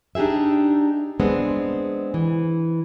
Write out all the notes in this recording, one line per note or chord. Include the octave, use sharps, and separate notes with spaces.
D4 D#4 G4 G#4 E5
G#3 B3 C4 D4
E3